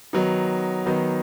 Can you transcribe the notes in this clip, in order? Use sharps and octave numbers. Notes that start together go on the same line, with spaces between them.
D#3 F#3 B3 D#4
D#3 F#3 B3 D#4